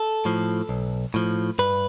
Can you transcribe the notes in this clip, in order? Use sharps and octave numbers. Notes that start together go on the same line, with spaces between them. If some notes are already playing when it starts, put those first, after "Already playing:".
Already playing: A4
A2 F3
B1
A2 F3
G2 B4